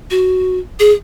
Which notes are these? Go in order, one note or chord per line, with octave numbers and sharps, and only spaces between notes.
F#4
G#4